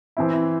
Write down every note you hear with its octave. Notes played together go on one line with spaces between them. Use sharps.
E3 C4 E4